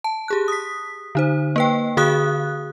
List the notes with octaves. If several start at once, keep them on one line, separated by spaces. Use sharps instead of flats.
A5
G4 G#4 F#6
D#6 B6
D3 D#4 C5
A#3 B4 G5
D3 F#4 G#4 F5 D#6 F#6